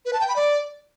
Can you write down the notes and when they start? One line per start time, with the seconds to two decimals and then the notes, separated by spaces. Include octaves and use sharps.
0.06 B4
0.13 A5
0.21 G5
0.28 B5
0.36 D5